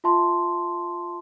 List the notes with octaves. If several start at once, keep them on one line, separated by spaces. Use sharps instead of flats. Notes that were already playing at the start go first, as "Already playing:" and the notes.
F4 E5 A5 C6